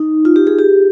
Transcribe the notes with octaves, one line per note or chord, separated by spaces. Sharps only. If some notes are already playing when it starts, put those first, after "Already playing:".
Already playing: D#4
F4
G4
G#4
G4